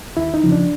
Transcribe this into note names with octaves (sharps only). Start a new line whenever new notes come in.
D#2 E4
D#4
C#3 F3
D4